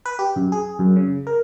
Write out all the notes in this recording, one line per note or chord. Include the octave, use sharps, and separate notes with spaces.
B4
G4
F#2
G#4
F#2
C#3
A#4